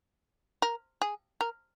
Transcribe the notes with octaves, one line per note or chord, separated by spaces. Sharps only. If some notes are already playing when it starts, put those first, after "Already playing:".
A#4
G#4
A#4